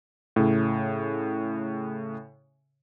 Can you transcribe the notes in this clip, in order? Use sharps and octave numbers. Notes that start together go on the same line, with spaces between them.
A2 C#3